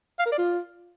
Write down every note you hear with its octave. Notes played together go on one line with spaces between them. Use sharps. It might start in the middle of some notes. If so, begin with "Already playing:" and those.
F5
A#4
D5
F4